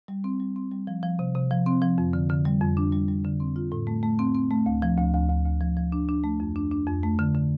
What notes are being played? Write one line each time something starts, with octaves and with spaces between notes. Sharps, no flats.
G3
C4
G3
C4
G3
F3
F3
C3
C3
F3
C4
F3
F2
D3
D3
G3
F2
D4
G3
G3
D3
C4
F4
A2
A3
A3
C4
C4
A3
D2
F3
D2
D2
D2
D2
F3
F3
D4
D4
A3
F2
D4
D4
F2
A3
D3
D3